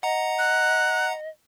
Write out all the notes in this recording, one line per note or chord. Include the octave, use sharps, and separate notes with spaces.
D#5 F#5 A#5
F#6